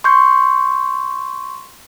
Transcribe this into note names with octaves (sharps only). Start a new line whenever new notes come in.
C6 C#6 G6